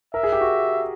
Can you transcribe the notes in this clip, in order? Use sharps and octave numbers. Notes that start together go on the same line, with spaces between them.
A#4 E5
G#4
G4
F#4